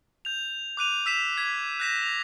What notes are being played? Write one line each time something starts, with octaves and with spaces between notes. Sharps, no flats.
G6 F7
D6 F#6 D#7 F7
E6 B6 E7
G#6 B6
F#6 G6 A#6 B6 E7
F7